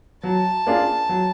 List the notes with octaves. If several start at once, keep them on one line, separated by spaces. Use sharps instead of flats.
F#3 A5
A#3 D4 F4 G#4
F#3